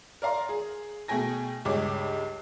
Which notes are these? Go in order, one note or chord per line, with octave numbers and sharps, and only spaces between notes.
A#4 D5 F5 A#5 C6
G#4
B2 A3 G#4 G5 G#5 A#6
C#2 G2 G#4 C#5 D6